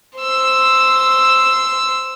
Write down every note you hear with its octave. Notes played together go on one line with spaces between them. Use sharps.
C5 E6